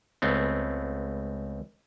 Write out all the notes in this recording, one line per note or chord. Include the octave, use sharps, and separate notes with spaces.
C#2 A3 B3 C4